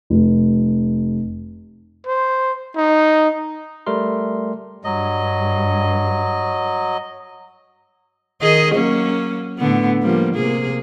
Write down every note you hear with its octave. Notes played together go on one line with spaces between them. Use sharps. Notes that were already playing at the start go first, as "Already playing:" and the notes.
F1
C5
D#4
G3 A3 A#4 C6
G2 F#3 D#5
D#3 G#4 D#5
F#3 A#3 C#4
A2 D3 B3
F3 G3 A#3
C3 A#3 G#4